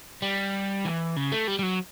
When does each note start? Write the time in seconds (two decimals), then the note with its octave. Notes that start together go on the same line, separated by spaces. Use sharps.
0.22 G3
0.85 E3
1.16 C#3
1.32 A3
1.48 G3
1.59 G3
1.63 F#3